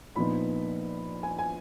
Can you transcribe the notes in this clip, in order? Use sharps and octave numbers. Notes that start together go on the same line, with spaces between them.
A#1 A#2 F3 B3 D#4 B5
G#5
G#5